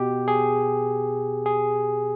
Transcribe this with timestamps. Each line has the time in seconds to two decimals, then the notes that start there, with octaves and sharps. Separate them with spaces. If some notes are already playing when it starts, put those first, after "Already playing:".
Already playing: B2 G4
0.28 G#4
1.46 G#4